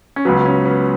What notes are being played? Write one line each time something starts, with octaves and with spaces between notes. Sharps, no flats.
C#4
C#2 C#3 F#3 B3
C#4
B3